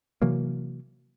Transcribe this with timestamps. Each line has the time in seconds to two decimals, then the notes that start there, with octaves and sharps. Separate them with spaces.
0.22 C3 E3 F#3 A#3